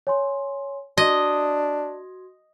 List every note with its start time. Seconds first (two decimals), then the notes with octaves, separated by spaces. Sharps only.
0.07 C#5 G#5 C6
0.98 D4 F#4 D#5 C6 G#6